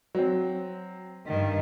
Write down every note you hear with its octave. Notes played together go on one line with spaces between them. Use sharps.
F#3 C4
G2 D#3